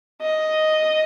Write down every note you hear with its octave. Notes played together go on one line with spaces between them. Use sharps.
D#5